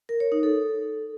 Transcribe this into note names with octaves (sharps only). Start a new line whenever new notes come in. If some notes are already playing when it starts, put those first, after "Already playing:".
A#4
C#5
D#4
A4